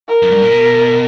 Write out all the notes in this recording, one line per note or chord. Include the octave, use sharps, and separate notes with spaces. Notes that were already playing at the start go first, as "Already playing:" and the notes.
A#4
F#2
G2
A#2
B2